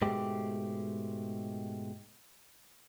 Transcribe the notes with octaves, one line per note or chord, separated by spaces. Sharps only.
G#2 B2 G#3 A3 G4